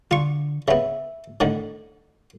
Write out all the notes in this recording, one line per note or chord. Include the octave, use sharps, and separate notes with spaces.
D3 F4 C#6
C#3 B3 E5
A2 D3 D#3